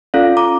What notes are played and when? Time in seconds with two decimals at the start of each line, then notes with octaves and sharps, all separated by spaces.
0.14 C#4 F4 A4 D5 F5
0.37 A#5 D6